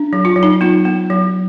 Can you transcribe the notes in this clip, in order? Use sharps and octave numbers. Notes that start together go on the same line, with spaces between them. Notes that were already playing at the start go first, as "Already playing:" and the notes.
Already playing: D4
F#3
F4
F#3
D#4
B3 F4
B3
F#3